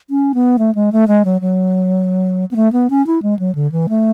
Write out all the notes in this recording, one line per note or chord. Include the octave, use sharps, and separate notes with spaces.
C#4
B3
A3
G#3
A3
G#3
F#3
F#3
B3
A3
B3
C#4
E4
G#3
F#3
D3
E3
A3